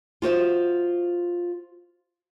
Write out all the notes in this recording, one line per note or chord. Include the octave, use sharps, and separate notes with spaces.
F4 F#4 C5 E5